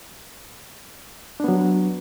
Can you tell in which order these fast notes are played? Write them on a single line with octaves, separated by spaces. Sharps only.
D4 B3 F#3